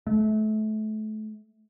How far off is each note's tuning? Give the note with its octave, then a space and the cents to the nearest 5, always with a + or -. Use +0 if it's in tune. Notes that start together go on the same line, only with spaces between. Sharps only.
A3 -30